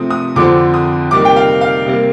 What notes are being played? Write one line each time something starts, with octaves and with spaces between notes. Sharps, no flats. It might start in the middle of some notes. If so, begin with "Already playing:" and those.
Already playing: C3 F3 A3 C4 D#6
D#6
F2 D3 F3 C4 D6
D#6
C3 D#3 G3 A#3 D6
G5
F5
F5
C3 G3 A#3